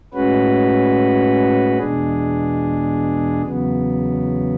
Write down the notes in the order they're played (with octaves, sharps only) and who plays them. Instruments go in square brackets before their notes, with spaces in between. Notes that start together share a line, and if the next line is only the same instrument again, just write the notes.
[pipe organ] A2 G#3 C#4 F#4 B4
E2 B2 G#3 D4 G#4
E2 C#3 F#3 B3